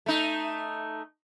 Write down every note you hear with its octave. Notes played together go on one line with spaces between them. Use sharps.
A3 D#4